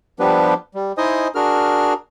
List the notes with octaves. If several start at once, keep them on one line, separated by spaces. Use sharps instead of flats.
F3 G3 B3 D4 G4 B4
G3
D#4 E4 C5 D#5 G#5 D#6
D4 F#4 G#4 A#4 F6